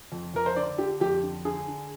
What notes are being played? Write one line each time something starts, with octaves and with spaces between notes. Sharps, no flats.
F2
F2 A#4
C5
D3 D5
D3 G4
F2 G4
D3
D3 G#4
D3